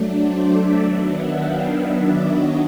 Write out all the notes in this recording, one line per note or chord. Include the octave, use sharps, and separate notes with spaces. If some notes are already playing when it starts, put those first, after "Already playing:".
Already playing: F#3 A3 D4
C5 D5
D5 E5
D#3 F#3 B3 D4
E5 F#5
F5 G5
E5 F#5
D5 E5
C#5 D#5